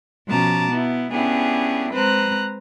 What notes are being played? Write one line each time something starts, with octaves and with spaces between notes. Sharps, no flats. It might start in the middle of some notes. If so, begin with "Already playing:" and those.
B2 F3 C#4 A5 A#5 D6
B3 E4
B3 C#4 D4 E4 G4 G#4
G#3 C4 B4 C5 A#5 F#6